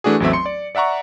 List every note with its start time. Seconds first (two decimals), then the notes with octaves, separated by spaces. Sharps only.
0.04 E3 A3 D4 F#4 G#4
0.20 A1 E2 F#3 A3 C4 E5
0.33 C6 C#7
0.46 D5
0.75 D5 E5 F#5 A#5 C#6